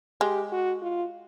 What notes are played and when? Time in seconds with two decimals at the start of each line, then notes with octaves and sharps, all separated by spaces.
0.21 G#3 G4
0.52 F#4
0.82 F4